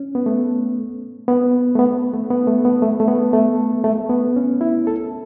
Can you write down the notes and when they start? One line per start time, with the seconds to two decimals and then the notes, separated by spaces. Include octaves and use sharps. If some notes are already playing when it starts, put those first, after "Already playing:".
Already playing: C#4
0.15 B3
0.26 A3
1.28 B3
1.75 A3
1.79 B3
2.14 A3
2.30 B3
2.47 A3
2.65 B3
2.82 A3
3.00 A3
3.08 B3
3.33 A3
3.84 A3
4.10 B3
4.36 C#4
4.61 E4
4.87 A4